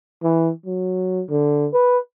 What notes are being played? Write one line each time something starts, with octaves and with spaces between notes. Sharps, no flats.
E3
F#3
D3
B4